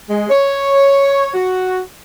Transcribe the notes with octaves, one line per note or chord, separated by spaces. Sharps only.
G#3
C#5
F#4